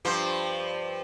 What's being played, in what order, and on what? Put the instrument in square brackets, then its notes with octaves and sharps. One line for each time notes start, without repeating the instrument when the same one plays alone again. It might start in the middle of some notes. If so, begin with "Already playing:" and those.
[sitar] G2 F3 C5